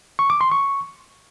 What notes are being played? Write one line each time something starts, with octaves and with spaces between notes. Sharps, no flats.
C#6
D6
C6
C#6